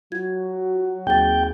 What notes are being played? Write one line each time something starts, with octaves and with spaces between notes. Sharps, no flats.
F#3 F4 F#4 G#6
D#2 A#3 C4 G#4 G5 A6